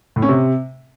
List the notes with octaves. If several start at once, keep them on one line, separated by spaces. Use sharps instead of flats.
A2
C#4
C3